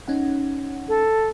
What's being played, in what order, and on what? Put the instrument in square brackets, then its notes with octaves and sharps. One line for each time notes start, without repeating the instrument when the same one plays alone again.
[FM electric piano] C#4 D#4 F#5
[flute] A4